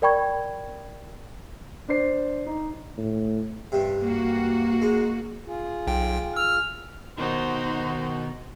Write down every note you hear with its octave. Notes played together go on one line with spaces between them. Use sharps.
A#4 D5 G5 B5 C#6 G#6
D4 C5 C7
D#4
A2
G2 C3
A#3 F#4
G#3
F4 G#4
B1 G5
E6 F6
B2 D#3 D#4 F#4 C5